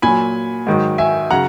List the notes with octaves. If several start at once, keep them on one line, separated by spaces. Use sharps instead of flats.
A#2 F#3 G#5 B5
G#2 D#3 F#3
E5 G#5
C#3 F#3 F#5 A#5